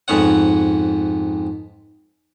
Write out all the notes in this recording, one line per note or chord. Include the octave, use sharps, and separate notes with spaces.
F2 G#2 B3 C#5 F#5